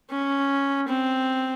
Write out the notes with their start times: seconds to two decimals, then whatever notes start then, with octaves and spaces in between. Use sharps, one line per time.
0.11 C#4
0.88 C4